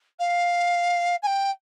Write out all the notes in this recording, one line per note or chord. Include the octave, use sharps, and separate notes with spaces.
F5
G#5
G5